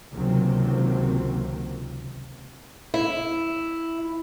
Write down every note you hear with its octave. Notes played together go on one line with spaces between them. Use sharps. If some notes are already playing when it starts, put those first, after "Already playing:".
C#2 C3 D#3 F#3 A#3 C4
E4